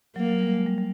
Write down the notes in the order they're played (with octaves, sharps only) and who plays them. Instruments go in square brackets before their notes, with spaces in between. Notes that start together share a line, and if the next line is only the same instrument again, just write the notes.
[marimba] F#3 [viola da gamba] A#3
[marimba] F#3
G3
G#3
G3
G3